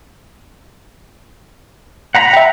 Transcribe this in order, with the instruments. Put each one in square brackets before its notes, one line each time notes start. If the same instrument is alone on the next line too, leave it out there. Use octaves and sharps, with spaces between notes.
[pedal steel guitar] F#5 A#5 B5
[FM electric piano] E5 G5